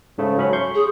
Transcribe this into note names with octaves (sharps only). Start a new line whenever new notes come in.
G#2 C#3 A3
F#3 C#4 B5
C6 C#6 G6
G#4